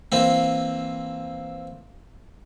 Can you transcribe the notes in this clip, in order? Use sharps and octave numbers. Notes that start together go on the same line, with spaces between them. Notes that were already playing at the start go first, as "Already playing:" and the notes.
E3 A#3 C4